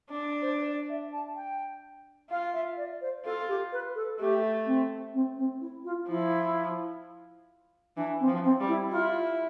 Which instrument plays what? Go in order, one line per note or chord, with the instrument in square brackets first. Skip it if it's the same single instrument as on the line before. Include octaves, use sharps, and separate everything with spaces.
[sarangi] D4
[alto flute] C5
D5
E5
A5
G5
[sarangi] F4 [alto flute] F5
[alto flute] E5
D5
C5
[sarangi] F4 [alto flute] A4
[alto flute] G4
B4
A4
[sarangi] A3 [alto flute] G4
[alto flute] C4
C4
C4
E4
F4
[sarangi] F3 [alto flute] E4
[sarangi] E3 [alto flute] D4
[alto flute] C4
[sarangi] F3
[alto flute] C4
[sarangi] G3
[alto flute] E4
[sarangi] E4 [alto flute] F4